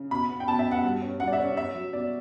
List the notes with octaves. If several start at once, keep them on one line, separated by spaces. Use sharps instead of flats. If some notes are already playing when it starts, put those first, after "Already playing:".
Already playing: C#3
B2 B5
B3
G5
B2 A5
E5
B2
F#5
G2
C#4
G2 F#5
D5
E5
C#4
C#4 E5
F#3
B2 D5